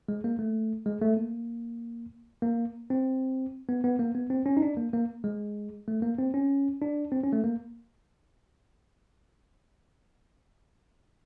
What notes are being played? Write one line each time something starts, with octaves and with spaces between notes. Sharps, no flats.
G#3
A#3
A3
G#3
A3
A#3
A#3
C4
B3
B3
A#3
B3
C4
C#4
D#4
D4
A#3
A#3
G#3
A3
A#3
C4
C#4
D4
C4
C#4
A3
A#3